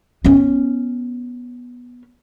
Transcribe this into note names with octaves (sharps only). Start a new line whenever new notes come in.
B3 C#4